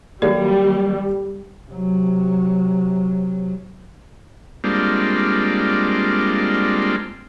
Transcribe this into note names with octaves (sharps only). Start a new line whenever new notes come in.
D#3 F#3 G3 A#3 G4 A4 D5
C3 F#3
G3 G#3 A#3 C4 D4 F4